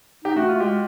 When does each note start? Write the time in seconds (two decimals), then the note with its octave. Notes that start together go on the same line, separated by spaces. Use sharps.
0.24 D#4 G4
0.36 A3 F#4
0.48 A3 F4
0.60 G#3 G4